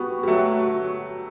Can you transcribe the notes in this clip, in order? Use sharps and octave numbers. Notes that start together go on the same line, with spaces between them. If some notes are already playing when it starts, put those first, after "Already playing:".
Already playing: G3 B3 F#4
G3
F#3 A3